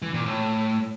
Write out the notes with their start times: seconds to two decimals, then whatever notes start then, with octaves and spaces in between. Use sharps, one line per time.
0.02 E3
0.14 A#2
0.26 A2